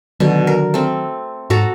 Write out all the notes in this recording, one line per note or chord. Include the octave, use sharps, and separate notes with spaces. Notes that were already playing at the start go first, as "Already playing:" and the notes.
B2 D3 D#3 F#3
A#4
A3 C4
G#2 F#4 A4 A#5